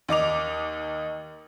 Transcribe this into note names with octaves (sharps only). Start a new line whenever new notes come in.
D#2 D#4 D6 F7